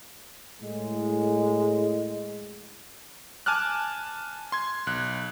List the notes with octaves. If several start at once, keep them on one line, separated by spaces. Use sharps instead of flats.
A2 G#3
G#5 A5 D6 F6 F#6
C6 G#6
B1 F#6